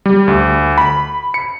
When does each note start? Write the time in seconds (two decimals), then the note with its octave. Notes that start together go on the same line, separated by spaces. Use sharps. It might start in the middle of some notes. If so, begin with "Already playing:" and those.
0.06 G3
0.28 D2
0.78 B5
1.34 C#7